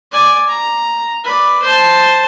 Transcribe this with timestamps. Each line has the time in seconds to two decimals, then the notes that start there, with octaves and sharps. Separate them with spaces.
0.12 D5 G#5
0.49 A#5
1.24 B4 D5
1.63 C5 A5